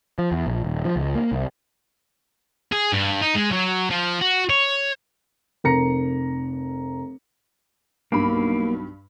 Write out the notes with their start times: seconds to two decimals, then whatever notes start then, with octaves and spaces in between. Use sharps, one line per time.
0.19 F3
0.32 E2
0.47 A#1
0.65 D#1
0.85 F3
0.96 C#2
1.15 A#3
1.32 C2
2.72 G#4
2.93 G2
3.22 D#4
3.36 G#3
3.52 F#3
3.90 F3
4.21 F#4
4.50 C#5
5.64 F1 A#4 A#5 A#6 C#7
8.12 B1 G2 A#3 B5